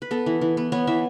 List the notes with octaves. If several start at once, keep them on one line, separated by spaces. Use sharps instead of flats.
B4
B3 A4
E3
E3
B3
B3 C#5
E3 E5